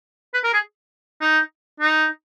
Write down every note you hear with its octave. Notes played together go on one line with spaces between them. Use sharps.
B4
A#4
G#4
D#4
D#4